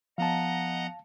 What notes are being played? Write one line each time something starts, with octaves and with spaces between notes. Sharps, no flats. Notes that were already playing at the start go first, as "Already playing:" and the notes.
F3 B3 D#5 F5 F#5 A5 A#5